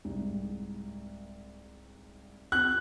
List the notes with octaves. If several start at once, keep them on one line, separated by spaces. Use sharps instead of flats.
C2 G#2
B3 C4 F4 F#6